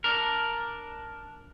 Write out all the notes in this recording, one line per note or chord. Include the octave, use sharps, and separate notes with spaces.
D4 A#4